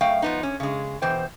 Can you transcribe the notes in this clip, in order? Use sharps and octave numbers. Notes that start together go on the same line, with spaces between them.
F#2 A3 F5 G5
F3 B3 D#4
C#4
C#3 G#3
B2 E3 C5 G5